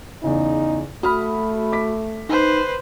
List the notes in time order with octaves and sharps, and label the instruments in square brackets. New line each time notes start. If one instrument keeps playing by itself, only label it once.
[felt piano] E2 C#3 [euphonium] D#4
[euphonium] A3 [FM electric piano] F#4 B5 [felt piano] D#6 F6
[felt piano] D6 B6
[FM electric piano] D#4 [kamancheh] B4 C5